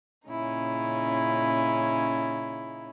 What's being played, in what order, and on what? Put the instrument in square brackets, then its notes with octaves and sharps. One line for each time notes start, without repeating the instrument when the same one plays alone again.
[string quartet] A#2 C#3 C#4 D#4 E4